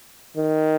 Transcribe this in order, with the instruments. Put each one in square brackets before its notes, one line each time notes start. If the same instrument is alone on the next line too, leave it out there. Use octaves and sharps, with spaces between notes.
[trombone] D#3